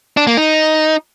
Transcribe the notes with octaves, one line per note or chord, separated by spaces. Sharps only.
D4
A#3
D#4